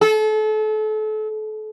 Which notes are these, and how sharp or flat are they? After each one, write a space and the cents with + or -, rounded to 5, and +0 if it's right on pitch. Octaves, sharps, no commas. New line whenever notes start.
A4 -35